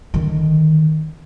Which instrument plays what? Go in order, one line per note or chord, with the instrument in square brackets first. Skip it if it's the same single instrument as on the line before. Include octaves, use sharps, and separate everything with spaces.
[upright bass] D3 D#3